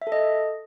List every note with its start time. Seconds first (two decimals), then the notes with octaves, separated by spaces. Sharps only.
0.02 E5
0.07 A4
0.12 D#5